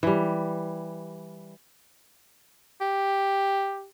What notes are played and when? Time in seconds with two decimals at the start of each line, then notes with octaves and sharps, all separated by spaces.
0.03 E3 G3
2.81 G4